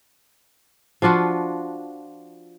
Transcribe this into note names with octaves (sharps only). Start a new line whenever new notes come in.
F3 D4 F4 F#4